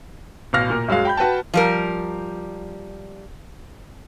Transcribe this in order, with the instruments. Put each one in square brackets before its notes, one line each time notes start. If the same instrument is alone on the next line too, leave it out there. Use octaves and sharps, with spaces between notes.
[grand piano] A1 B2 F5 F6 A#6
A#2 A#4
F#2 F#3 G#3 F5
G5 B5 G6
F#4 B4 G5 A5
[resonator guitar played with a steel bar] F3 G3 A#4